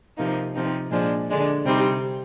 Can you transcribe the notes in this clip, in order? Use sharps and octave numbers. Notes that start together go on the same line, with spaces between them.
C3 F3 A#3 D#4
C3 F3 C4 D#4
A#2 F3 G#3 D4
D3 G#3 D4
C3 G3 C4 D#4